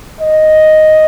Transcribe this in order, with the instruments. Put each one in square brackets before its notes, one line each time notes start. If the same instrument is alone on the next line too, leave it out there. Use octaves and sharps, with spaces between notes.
[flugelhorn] D#5